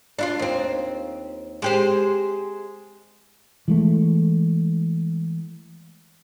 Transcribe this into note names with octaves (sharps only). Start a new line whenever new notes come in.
D4 E4 F4
D#2 C4
G#3 G4 C5
E3 G#3 A3